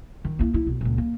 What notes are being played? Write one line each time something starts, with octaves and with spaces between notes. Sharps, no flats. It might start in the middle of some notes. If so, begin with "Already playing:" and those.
D#3
A#3 E4
E4
B1
C#2 A#2
A#3